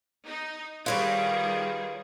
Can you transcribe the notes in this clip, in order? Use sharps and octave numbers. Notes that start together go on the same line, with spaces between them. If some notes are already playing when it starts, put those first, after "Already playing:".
D#4
D#3 G3 F4 G#4 B4 C#5